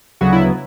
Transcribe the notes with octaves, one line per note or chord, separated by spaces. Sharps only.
D2 C#3 F#3 B3 F#4
E4